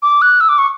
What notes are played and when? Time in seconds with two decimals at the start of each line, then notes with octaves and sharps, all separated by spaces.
0.02 D6
0.22 F#6
0.41 E6
0.49 D6
0.58 C#6